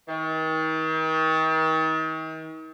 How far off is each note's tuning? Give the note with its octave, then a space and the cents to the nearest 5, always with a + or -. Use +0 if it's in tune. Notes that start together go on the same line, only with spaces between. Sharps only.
D#3 +40